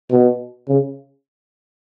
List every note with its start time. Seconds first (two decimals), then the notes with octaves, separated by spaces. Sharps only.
0.11 B2
0.68 C#3